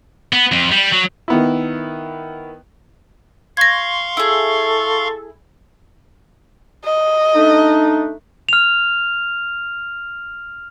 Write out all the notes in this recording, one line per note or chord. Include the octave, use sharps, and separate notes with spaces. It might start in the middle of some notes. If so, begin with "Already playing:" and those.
B3
F2
G3
F#3
D#3 B3 E4
F5 C6 C#6 G#6 A#6
E4 G#4 A4
D#5
A3 D4 D#4
F6 F7